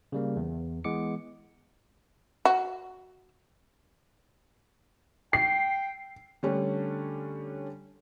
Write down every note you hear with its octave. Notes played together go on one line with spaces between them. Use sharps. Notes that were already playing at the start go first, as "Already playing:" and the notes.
C#3 G3 A#3
E2
E3 G#3 B3 D6 C#7
F#4
G5 C7
D3 G3 A3 C#4 D4